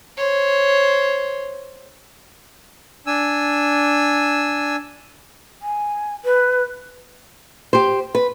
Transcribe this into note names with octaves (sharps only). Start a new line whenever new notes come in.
C5 C#5
D4 G#5 E6
G#5
B4
G4 C5
B4